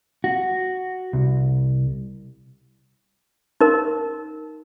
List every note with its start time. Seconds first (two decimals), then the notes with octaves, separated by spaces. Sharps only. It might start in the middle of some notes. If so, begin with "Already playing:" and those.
0.24 F#4
1.13 C2
3.61 D#4 A#4